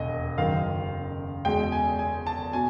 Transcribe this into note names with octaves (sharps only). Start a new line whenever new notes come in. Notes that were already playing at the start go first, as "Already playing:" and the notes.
Already playing: E1 D#2 D#5
F#1 F#2 D#3 F5
E2 B2 G#3 G5
G#5
G#5
A5
B2 G#5